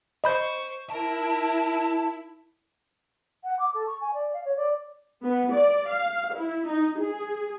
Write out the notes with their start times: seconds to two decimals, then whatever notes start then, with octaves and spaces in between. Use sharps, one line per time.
0.24 C5 D#5 B5 C#6 G6
0.90 E4 A#4 A5
3.44 F#5
3.59 D6
3.74 A4
3.87 C#6
4.01 G#5
4.14 D5
4.33 F5
4.45 C#5
4.57 D5
5.24 B3
5.53 D5
5.90 F5
6.35 E4
6.68 D#4
7.01 G#4